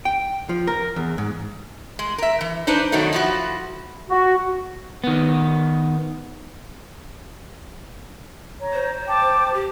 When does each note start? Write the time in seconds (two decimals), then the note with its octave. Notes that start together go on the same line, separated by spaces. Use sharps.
0.05 G5
0.49 F3
0.67 A#4
0.96 E2
1.18 G#2
1.99 G#3
2.18 A#4 E5
2.41 E3
2.67 D4 D#4 B4 C5
2.92 B2 D#3 F#3 A3 D#4
3.13 F3 E4 F#4
4.10 F#4
5.04 D#3 B3
8.59 C#5 A#5
8.73 C5
9.07 G5 A5 D6
9.54 G4